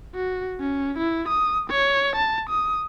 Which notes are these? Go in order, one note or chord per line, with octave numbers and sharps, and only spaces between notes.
F#4
C#4
E4
D#6
C#5
A5
D#6